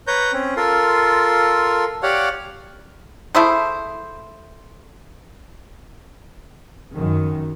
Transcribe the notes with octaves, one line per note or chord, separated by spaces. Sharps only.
B4 C#5 A#5 G6
C4 C#4
F4 A4 A#4 C6
G4 C#5 D5 F5 F#5
A3 E4 G#4 C5
F#2 D#3